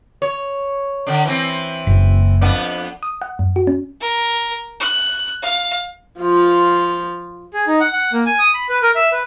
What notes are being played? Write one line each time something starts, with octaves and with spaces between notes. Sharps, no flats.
C#5
D3 D4
E3 C4
F#1
F2 B3 D4
D#6
F#5
F#2
F#4
C#4
A#4
F#6
F5
F3 F4
G#4
D#4
F#5
F#5
A#3
G#5
D#6
B5
B4
A#4
E5
B4